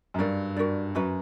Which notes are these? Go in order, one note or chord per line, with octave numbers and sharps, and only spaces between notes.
F#2
G2 F#4 A#4 D5
G2 F#4 A#4 D5
F#2 C#4 F#4 B4